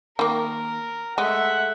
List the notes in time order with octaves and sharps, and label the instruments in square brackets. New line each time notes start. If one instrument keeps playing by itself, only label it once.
[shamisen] D#3 A#3 [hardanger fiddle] A#4
[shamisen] G#3 [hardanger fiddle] A3 E5 [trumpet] F#5